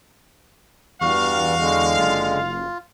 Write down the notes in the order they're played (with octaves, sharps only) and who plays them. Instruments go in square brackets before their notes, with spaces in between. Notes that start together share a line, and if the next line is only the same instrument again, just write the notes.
[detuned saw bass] E2 [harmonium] G2 G3 [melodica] F#4 C#6 [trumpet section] F5
[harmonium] D3 G#3
[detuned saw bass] F#1 [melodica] F4